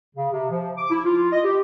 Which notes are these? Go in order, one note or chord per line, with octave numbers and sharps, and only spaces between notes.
C#3
C3
F3
D6
E4
F4
D#5
G4